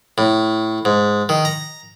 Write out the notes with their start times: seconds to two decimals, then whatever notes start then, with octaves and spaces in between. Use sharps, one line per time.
0.18 A2
0.85 G#2
1.29 D#3
1.45 A#5